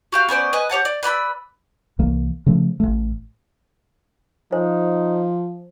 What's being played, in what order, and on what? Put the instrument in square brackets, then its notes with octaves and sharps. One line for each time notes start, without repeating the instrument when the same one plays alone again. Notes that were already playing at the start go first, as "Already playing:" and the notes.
[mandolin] F#4 G4 F5
B3 C#4 C5 D5
B4 D#5 G#5
G4 C#5 F#5 A5
D5
B4 D5 B5 E6
[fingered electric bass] C2 E3 A#3
C#3 F3 A3
A1 A3
[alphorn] F3 [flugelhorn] D#4 [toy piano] C5